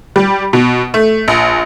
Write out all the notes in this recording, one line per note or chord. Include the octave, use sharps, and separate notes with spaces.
G3
B2
A3
A#1